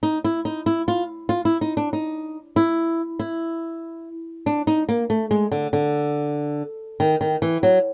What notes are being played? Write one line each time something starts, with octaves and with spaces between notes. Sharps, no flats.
D#4
E4
D#4
E4
F4
F4
E4
D#4
D4
D#4
E4
E4
D4
D#4
A#3
A3
G#3
D3
D3
D#3
D#3
E3
F#3